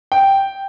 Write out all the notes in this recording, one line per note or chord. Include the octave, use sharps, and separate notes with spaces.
G5